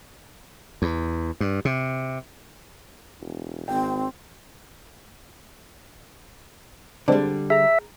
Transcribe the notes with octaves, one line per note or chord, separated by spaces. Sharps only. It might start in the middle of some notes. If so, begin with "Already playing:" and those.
E2
G2
C3
E1
G#1 C4 G5
D3 G3 G#3 C4 D5
G#4 E5 A#5